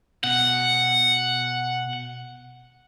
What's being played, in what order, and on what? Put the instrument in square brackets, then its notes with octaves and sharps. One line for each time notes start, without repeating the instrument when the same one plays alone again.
[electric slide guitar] B2 [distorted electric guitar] F#5